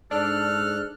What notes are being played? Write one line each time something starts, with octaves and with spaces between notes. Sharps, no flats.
G#2 D4 A4 F6 F#6